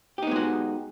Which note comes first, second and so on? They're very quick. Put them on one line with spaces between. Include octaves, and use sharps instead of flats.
G4 D#4 B3 G#3 F#4